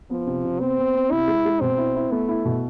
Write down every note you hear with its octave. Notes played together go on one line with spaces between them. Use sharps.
F3 B3
C3
C3
B3 C4
B3
B3
C3 E4
G#3
G#3
B2 C4
E4
E4
A3 B3
E4
B2